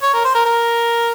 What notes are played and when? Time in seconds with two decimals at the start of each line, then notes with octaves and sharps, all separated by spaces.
0.02 C#5
0.14 A#4
0.25 C5
0.35 A#4
0.45 A#4